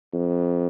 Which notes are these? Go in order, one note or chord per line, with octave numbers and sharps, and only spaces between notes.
F2